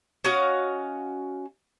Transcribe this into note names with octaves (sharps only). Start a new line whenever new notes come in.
C#4 F#4 D#5 F5